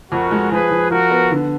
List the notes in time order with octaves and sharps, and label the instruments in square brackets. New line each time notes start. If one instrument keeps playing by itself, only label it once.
[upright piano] F2 [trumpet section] F#4 A#4
[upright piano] G#3
[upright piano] F3 [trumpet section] G#4 B4
[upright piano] F3
[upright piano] F3 [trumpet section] F#4 A#4
[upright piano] B3
D3